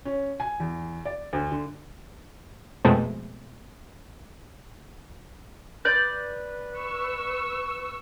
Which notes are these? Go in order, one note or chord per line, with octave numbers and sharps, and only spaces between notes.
C#4
G#5
E2
D5
D2
D3
F2 B2 G#3 A3 C4
B4 D5 G6
C#6 E6